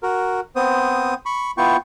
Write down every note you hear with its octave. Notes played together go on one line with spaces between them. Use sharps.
F#4 A#4
B3 C4 C5 D#6
B5 C#6
B3 E4 F4 G5 C#6